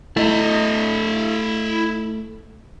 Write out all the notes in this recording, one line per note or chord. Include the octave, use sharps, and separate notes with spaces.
A3 E4 D#5